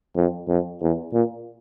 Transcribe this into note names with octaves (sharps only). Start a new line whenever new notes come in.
F2
F2
E2
A#2